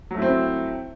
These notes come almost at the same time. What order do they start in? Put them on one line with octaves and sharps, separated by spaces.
F#3 A3 E4 C4